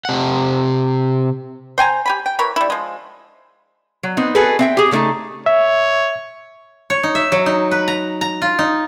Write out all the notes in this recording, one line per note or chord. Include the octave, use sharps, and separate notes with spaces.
C3 F#5
C5 G5 G#5 A#5
G4 G#5 B5
G5
E3 A#4 C#5 B5
G3 E4
F3 G#3
F#3
B3 C4 D#4
F#4 G#4 A4 B4
C4 E5 G5
G4 G#4
C#3 F3 A3 D#4 A5
C#5 E5
C#5
D#4
E5
F#3
D#4
B4
A#5
A#5
F4
D#4